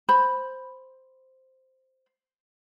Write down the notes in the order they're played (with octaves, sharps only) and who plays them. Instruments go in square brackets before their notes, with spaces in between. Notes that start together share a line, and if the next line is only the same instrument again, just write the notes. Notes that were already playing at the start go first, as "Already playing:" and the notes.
[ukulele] C5 B5